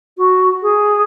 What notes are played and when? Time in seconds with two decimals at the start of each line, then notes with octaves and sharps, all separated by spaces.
0.18 F#4
0.62 G#4